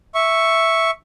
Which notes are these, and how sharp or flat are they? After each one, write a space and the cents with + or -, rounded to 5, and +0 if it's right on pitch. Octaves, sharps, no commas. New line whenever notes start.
E5 +0 C#6 +0